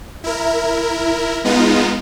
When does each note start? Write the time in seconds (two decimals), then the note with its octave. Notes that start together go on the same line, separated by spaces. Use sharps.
0.24 E4 A#4
1.44 G#3 B3 D#4 F4